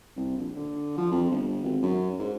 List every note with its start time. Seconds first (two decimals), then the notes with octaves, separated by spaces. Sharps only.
0.16 C2
0.37 A#1
0.56 D3
0.98 F3
1.12 F2
1.31 G1
1.64 G#1
1.83 F#2
2.20 G#2